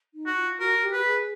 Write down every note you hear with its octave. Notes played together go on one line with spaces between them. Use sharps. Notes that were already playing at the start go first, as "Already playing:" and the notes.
D#4
F#4
F4
F#4 A#4
G4
B4
G4
G#4